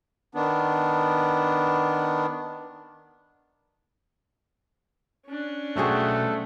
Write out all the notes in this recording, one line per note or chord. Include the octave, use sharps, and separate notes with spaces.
D#3 B3 D4
C#4 D4
B1 A3 C4 F#4 G#4